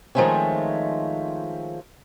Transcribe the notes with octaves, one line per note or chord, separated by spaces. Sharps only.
D#3 F3 G#3 A3 C4 C#4